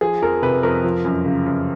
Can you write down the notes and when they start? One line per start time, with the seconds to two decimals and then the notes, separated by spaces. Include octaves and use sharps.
0.01 F3 G#4
0.22 F2 A#4
0.43 C3 B4
0.63 F2 A#4
0.84 F3
1.05 F#2
1.26 C#3
1.46 F#2